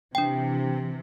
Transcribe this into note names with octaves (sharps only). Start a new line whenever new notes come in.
C3 E3 D4 G5